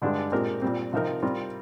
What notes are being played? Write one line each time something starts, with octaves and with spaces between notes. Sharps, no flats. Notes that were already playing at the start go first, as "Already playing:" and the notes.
G2 D3 G#3 D4 G4
A#2 G#3 C4 G4 A#4
A#2 G3 C4
C3 F3 C4 D#4 A#4
G3 C4 F4 A#4